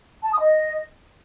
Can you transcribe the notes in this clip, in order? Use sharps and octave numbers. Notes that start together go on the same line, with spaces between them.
A5
D#6
D#5